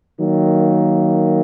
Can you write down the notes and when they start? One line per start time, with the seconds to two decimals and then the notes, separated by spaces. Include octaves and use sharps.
0.18 D#3 F#3 A#3